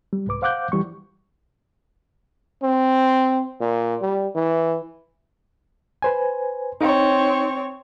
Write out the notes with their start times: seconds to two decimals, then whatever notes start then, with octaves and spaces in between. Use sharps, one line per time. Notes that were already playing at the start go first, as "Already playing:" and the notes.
0.13 G3
0.27 C2 G#2 B4 D6
0.42 C5 F5 F#5 D6 F#6 G6
0.72 E3 G3 C#6
2.62 C4
3.60 A#2
4.01 G3
4.35 E3
6.02 B4 C5 G#5
6.81 C4 D#4 C#5